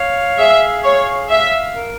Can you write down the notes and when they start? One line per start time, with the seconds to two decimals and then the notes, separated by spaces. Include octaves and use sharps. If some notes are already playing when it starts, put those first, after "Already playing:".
Already playing: C#5 F5
0.38 G#4 E5
0.84 C#5 F5
1.30 E5 F5
1.75 A#4